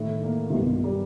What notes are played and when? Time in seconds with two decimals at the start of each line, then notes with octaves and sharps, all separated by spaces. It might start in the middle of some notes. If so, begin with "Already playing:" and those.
Already playing: A2 D#3
0.24 A#3
0.50 C3
0.54 B1 G2 B2
0.84 G3